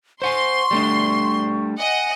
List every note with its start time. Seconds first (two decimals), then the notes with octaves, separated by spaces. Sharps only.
0.22 C5 F#5 G#5 C6 C#6
0.71 G3 A3 D4
1.79 D#5 F#5 G#5